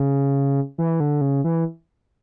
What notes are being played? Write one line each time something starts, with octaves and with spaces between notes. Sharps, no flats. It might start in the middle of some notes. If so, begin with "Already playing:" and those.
Already playing: C#3
E3
D3
C#3
E3